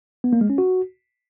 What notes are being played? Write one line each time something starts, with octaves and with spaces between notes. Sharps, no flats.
B3
A#3
G#3
C#4
F#4